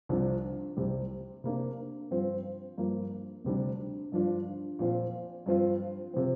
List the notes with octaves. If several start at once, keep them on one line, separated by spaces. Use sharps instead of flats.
C2 C3 F3 D4
C2 C3 G3
C3 A#3 D4
G2 F3 C4 F4
G2 F3 A#3 F4
D2 C3 G3 D4
G2 F3 D4 F4
A#2 F3 C4 F4
G2 F3 C4 F4
C3 F3 C4